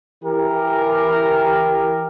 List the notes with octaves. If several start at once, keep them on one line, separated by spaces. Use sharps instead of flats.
E3 G4 A#4